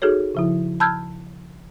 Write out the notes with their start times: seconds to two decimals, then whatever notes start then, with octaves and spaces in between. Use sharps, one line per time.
0.02 D#4 F#4 G#4 A4 C#5
0.35 C#3 F3 E4
0.80 A5 B5 E6 F6 G6 G#6